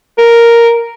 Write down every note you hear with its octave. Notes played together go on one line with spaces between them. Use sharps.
A#4